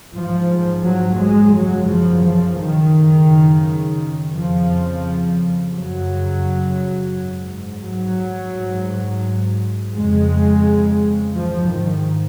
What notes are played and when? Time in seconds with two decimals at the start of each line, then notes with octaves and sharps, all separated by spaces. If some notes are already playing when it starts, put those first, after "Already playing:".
0.14 G#2 F3
0.85 F#3
1.20 G#3
1.54 F#2 C#3 F#3
1.89 F3
2.25 F3
2.60 D#3
2.94 F#2 C#3
4.34 F2 C#3 F3
5.74 F#2 C#3 F#3
7.14 G#2
7.85 F#3
8.55 G#2
9.95 F2 C#3 G#3
11.34 G#2 F3
11.69 D#3